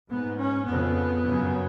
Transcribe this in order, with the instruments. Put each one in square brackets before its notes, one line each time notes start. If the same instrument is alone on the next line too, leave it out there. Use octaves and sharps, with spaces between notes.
[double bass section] G#2 B3
C#4
F2 C#3 B3
F#2 C#3